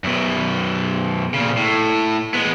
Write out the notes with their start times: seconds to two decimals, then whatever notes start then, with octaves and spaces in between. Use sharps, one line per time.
0.04 F#2 B2
1.34 A#2 C#3
1.57 A2
2.34 G#3 B3